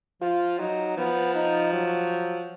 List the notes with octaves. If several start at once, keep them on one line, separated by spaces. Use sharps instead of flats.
F3 F4
F#3 D#4
F3 B3
D#4
F#3